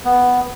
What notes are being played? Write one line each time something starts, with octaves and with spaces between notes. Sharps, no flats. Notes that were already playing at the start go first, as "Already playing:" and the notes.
B3